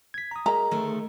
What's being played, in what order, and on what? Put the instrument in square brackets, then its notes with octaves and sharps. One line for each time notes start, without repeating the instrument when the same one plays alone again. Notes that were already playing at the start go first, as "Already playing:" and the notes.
[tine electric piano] G#6 B6
A#5 D#6
[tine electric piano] G#4 A#4 D#5 [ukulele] A#5
[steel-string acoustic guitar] D2 D#3 A3